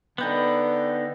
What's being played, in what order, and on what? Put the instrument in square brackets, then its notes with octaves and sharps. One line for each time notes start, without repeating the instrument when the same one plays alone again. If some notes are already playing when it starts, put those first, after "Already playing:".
[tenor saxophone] D3 [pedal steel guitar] B3 D#4 [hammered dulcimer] B4 G5 A5